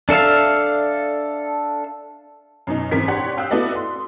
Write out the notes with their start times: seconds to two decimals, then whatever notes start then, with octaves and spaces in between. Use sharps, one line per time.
0.09 D4 A4 E5 F5
2.67 F#2 B2 D#4
2.91 G#1 F#2 E3 C4 A#4 B6
3.08 D4 G4 C#5 F#5 G5 C6
3.38 F5 G5 D#6 E6 F#6
3.51 B3 E4 F#4 A4 D5 D#5
3.75 C6